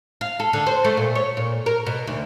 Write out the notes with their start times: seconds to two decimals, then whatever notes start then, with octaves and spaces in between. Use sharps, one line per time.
0.21 F5
0.40 A4
0.53 D3
0.67 C5
0.85 A3
0.97 A#2
1.15 C#5
1.37 A#2
1.66 A#4
1.87 B2
2.07 D2